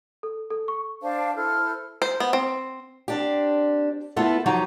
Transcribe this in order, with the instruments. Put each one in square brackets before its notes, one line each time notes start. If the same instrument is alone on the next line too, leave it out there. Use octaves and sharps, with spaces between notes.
[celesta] A4
A4
C#6
[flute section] D4 C5 F5 A5
E4 A4 C5 F6
[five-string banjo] C5
B3
C4
[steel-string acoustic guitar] C4 D4 G4
A3 B3 E4 F4 A4
F3 F#3 D#4 G4 A#5